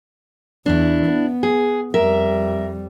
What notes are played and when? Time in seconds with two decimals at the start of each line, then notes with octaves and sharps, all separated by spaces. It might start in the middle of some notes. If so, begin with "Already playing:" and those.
0.66 E2 D4 E4
1.06 B3
1.43 G#4
1.94 F2 G3 A#4 E5